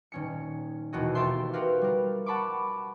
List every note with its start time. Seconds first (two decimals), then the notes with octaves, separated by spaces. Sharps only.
0.12 D#1 C#4 C#7
0.93 E1 D#2 F#4 D#5
1.15 F4 G4 A4 C5 E5 C6
1.53 F#4 G4 A#4 B4 F5
1.82 G3 A#4
2.26 F#5 A5 B5 C#6 D6